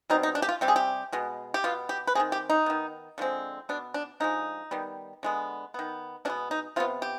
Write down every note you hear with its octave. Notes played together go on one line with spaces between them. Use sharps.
B2 G3 C4 D#4
D#4
D4
G4
F4
C3 G3 C4 G4
G#4
G4
B2 G#3 B3
G4
B2 B3 F4
G4
B4
D#3 G#3 C4 G#4
G4
D#4
D#3 B3
D3 F3 G#3 C4
B2 B3 D4
D4
D3 F3 G#3 D#4
D#3 G3 B3
D3 G#3 B3
D#3 B3
B2 G#3 B3 D4
D#4
C3 F3 B3 F4
G4